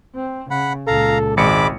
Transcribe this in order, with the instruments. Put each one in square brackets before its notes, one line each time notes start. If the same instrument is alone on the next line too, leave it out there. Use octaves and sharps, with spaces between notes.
[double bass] C4
[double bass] C#3 [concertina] F#5 B5
[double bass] C#2 A#2 [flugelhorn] A4 [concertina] F5 A#5
[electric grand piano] G#1 C#7 [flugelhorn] G#3 [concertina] B5 D6